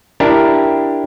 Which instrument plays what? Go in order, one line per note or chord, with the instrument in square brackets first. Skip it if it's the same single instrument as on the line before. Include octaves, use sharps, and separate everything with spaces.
[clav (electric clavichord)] D4 E4 G4 A#4